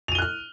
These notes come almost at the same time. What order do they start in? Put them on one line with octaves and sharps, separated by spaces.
F7 D#7 G7 F#6 F6